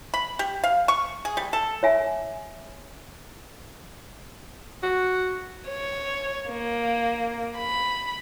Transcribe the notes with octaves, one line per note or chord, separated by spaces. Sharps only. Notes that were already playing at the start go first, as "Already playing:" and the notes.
B5
G4
F5
C#6
G#4
G3
A4
C#5 E5 G#5
F#4
C#5
A#3
B5